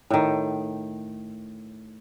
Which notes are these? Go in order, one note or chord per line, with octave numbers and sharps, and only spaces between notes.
A2 D#3